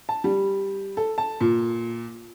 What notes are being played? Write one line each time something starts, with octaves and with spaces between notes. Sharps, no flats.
A5
G3
A4
A5
A#2